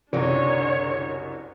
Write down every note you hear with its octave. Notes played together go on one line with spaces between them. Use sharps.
F#1 C2 F#2 D3 G#3 D4 D#4 C#5